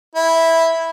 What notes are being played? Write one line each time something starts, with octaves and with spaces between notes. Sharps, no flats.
E4